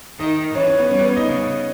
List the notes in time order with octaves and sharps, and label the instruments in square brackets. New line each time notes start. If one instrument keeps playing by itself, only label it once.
[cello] D#3 [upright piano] D#4 D#5
[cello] E3 [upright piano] C#4 C#5
[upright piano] C#4 C#5
B3 B4
[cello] G3 [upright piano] C#4 C#5
[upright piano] B3 B4
C#4 C#5
D#4 D#5
[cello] C#3 [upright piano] C#4 C#5